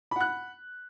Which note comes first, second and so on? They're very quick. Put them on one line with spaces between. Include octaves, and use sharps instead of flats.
B5 F#5 F#6